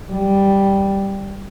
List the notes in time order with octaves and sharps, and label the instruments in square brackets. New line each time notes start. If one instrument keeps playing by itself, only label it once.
[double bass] G3